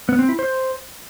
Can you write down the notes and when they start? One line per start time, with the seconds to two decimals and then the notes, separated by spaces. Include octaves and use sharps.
0.09 B3
0.19 C4
0.29 E4
0.39 C5